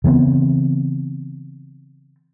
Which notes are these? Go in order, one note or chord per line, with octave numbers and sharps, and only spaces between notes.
C#3 E3 B3 C4